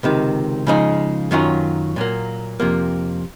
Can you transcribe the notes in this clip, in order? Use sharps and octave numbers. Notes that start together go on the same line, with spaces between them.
C#2 C3 D#3
C#3 F3 G#3 D#4
F#2 D#3 F#3 C#4 F4
A#2 F#3 A#3
F2 C3 F3 A#3